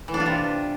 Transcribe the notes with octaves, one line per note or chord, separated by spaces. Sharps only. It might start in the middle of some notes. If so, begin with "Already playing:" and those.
E3
D4
F4
C3